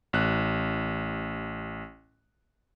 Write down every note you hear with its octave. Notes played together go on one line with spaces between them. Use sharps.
A1 F#6